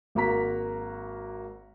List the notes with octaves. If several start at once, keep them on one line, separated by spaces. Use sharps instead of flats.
G#1 A#3 F#4 A#5 B6